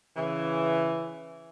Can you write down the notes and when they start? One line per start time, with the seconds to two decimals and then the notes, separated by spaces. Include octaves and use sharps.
0.17 C#3 E3